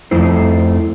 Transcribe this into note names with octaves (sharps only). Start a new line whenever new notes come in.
F2 A3 E4 C5